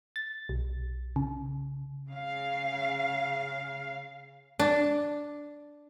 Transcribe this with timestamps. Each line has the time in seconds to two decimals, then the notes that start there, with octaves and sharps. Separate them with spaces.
0.16 A6
0.49 B1
1.16 C#3
2.09 C#3 F5
4.59 D4